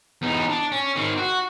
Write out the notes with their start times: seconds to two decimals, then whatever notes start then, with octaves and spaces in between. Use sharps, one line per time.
0.22 E2 D#4
0.50 D4
0.72 C#4
0.96 D#3 C4
1.18 F#4